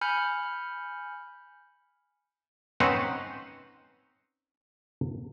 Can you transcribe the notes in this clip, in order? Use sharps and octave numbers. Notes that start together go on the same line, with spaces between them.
G#5 B5 F6 G6 C#7
C4 C#4 D#4 B4 C5 F#5